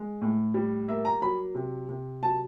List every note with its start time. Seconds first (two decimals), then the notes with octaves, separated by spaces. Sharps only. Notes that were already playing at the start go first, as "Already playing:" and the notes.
Already playing: G#3
0.21 A2
0.54 G3
0.88 A#3 E5
1.05 A#5
1.22 F#3 B5
1.55 C3
1.89 C3
2.22 F#3 A5